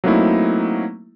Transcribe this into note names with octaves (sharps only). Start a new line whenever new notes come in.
F#3 A3 A#3 C4 D#4 E4